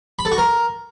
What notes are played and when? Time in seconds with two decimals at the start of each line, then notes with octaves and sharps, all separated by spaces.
0.19 B5
0.25 A4
0.32 F#4
0.38 A#4